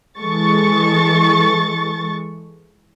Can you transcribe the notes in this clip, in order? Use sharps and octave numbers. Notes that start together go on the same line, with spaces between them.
E3 G#3 A4 C#6 A6